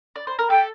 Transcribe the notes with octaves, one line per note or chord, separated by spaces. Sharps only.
D5
C5
A#4
A4 G5